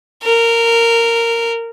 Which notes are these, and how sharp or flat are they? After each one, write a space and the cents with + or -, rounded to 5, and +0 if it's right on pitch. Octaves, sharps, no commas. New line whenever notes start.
A#4 -15